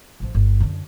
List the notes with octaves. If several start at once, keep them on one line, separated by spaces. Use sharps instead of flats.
A1 F3
G1
F#2 D3